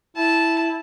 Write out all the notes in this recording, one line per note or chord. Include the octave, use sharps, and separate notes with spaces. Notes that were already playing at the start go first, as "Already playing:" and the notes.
E4 A5